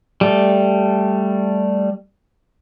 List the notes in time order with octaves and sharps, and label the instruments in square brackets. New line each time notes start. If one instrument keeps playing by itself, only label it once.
[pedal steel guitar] G3 A3